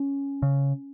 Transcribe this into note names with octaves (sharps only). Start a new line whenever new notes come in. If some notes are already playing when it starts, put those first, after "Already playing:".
Already playing: C#4
C#3